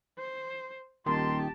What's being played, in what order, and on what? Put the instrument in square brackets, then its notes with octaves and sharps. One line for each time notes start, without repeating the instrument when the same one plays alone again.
[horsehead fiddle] C5
[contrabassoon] D#1 [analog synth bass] D#3 [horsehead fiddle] G4 A5 [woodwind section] C6